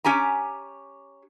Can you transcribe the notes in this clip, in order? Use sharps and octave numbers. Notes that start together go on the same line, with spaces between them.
C#4 G4 G#5 A#5